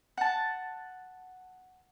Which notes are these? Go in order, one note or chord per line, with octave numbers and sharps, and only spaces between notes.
F#5 A5